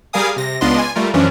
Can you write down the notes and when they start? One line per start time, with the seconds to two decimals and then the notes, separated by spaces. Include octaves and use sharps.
0.13 G3 G#4 A#4 F5 G#5 D#6
0.36 C3 A#6
0.61 C#2 B3 D4 F4 D#5 C6
0.78 G#5
0.95 G3 A3 F4 A#4
1.14 F#2 E3 F3 C#4 D4